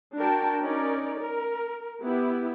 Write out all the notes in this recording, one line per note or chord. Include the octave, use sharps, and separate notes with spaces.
D4 F#4 A#4 G5 A5
C#4 D#4 A#4 D5
A#4
B3 E4 G4